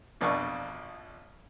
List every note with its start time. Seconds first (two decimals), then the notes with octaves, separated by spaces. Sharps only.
0.21 A#1 F2 B2 D4 F4 C#6